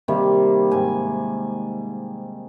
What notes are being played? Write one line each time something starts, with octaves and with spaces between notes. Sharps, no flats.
C3 D#3 G3 A#3
G#2 G#5